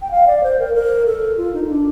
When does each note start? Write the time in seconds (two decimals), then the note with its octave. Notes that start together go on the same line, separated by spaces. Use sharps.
0.02 G5
0.11 F5
0.27 D5
0.43 C5
0.59 A#4
0.75 A#4
1.06 A4
1.37 F4
1.54 D#4
1.64 D#4
1.69 D4